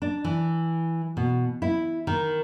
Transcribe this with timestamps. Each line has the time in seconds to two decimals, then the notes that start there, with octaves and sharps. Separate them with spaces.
0.02 D4
0.24 E3
1.17 B2
1.62 E4
2.07 D#3